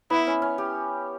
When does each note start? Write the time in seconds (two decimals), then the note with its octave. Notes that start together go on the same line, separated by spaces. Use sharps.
0.10 B3 E4
0.27 C#4
0.42 C#4
0.58 G4